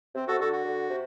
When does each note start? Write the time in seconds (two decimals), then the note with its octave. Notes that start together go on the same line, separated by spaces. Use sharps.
0.15 C3 C4
0.28 C3 F#4 A4
0.40 D3 F#4 A4
0.53 F#4
0.65 D3
0.90 C3